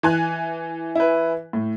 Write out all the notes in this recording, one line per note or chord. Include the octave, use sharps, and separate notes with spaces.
E3 G#5 F#6
E4 B4
A2